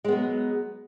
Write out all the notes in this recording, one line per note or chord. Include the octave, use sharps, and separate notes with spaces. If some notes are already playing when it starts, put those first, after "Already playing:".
F#3 G#3 B3